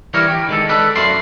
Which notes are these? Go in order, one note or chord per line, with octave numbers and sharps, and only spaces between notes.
E3 G3 G4 A#4 C#5
G4
D#3 G#3 A4
A4 B4 D5
F#2 F3 A3 D5 C6